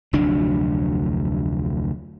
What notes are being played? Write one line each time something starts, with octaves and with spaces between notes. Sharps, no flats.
F1 D2 F#3 D4